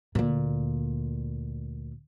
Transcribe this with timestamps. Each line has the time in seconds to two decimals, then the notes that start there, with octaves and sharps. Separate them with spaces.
0.15 D2 A#2